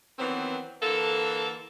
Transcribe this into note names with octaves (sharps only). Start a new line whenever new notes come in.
D#3 E3 F#3 B3 C4
D3 E3 A#3 A4